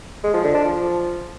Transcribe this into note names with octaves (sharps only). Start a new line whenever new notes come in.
G#3
F3
D3
D4
F3